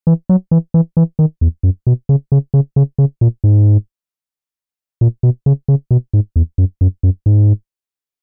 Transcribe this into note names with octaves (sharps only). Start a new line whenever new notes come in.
E3
F#3
E3
E3
E3
D#3
E2
F#2
B2
C#3
C#3
C#3
C#3
C#3
A#2
G#2
A#2
B2
C#3
C#3
B2
G#2
E2
F#2
F#2
F#2
G#2